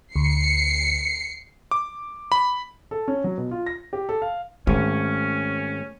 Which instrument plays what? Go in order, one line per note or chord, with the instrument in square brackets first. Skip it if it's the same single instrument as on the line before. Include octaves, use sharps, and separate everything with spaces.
[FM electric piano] D2 [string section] C7 C#7
[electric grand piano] D6
B5
[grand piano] A4
C#4
F#3
B2
F4
A#6
G4
A4
F5
[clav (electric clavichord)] G#1 [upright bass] A3 [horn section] C#4